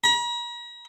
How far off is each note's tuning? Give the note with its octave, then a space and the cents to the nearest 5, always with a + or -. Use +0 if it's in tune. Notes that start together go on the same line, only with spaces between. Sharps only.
A#5 +45